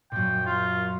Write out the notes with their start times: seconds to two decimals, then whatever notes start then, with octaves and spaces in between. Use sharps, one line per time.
0.12 F#2 A#2 G5
0.46 F4